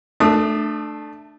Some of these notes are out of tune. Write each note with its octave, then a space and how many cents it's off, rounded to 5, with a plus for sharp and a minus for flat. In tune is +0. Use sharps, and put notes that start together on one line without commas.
A3 +0 D4 +25 D#6 -15